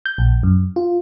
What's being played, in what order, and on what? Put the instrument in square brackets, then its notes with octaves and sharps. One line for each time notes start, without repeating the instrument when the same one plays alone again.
[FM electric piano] G6
A#1
F#2
F4